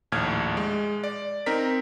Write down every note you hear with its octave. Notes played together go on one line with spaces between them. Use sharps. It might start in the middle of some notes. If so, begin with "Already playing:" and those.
A#1 D#2 A2 F6 G#6
G#3
D5
C4 D#4 A#4 A#5 B6